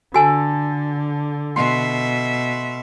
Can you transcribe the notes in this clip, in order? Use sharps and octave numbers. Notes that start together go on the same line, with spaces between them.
D3 F#4 A4 G#5
B2 E5 C6